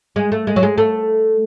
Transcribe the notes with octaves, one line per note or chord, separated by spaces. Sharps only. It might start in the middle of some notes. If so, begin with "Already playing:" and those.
G#3
A3
G#3
F#3
G#3
A3